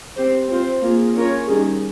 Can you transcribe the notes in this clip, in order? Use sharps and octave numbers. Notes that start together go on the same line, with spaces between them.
C4 G4 C5
C4 F4 C5
A#3 F4 G#4
C#4 F4 A#4 C#5
D#3 G3 C#4 G#4